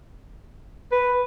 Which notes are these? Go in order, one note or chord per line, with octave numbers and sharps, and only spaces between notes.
B4